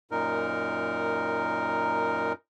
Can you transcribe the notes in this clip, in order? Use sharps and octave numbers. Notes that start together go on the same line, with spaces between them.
F#2 A#2 D#4 A#4